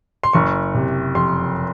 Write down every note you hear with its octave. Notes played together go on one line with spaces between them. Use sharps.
C6
F#1 C#6
C3
F2 C6